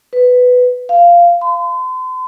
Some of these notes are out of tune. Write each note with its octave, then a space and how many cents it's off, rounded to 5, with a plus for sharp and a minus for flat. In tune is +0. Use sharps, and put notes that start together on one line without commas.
B4 +10
F5 -10
C6 -40